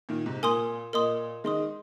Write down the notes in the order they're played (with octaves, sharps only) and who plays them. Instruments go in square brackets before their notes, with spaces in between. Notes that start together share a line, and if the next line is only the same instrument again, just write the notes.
[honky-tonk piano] A#2 D#3
G#2 C3
[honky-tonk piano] A#2 [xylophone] A#4 G#5 C6 D#6
[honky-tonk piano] A#2 [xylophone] A#4 D#5 C6 D#6
[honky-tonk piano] D#3 G#3 [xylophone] D#5 C6 D#6